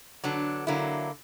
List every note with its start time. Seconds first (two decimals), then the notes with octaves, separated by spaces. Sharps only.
0.24 D3 F#3 B3 D4
0.67 D3 F#3 A#3 E4